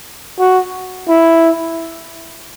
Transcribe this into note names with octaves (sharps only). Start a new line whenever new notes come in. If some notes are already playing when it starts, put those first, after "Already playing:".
F#4
E4